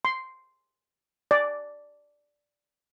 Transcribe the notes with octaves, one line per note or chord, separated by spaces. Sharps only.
C6
D5